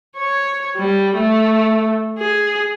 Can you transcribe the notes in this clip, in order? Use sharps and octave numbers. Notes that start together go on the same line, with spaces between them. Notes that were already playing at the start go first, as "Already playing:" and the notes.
C#5
G3
A3
G#4